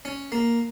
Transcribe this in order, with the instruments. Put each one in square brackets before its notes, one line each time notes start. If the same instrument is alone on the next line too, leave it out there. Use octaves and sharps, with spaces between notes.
[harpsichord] C#4
A#3